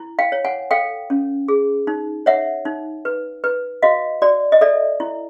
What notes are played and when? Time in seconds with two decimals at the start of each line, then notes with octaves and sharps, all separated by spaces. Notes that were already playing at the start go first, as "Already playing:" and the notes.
Already playing: E4
0.19 F5 G5
0.32 C#5
0.45 F#5 G#5
0.71 A4 F5 G5
1.10 C#4
1.48 G#4
1.87 D#4
2.26 C#5 E5 F#5
2.65 D#4
3.05 B4
3.44 B4
3.82 F#4 D#5 F5
4.22 F#4 D5
4.52 D#5
4.61 A4 D5 E5
5.00 E4